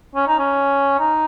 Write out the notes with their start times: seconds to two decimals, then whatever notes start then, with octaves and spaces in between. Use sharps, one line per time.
0.15 C#4
0.27 D#4
0.39 C#4
0.99 D#4